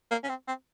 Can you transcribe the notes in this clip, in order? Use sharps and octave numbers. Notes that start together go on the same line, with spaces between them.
A#3
C#4
C4
C4